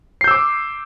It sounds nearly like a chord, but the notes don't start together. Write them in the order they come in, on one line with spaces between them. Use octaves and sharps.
C7 G6 E6 D6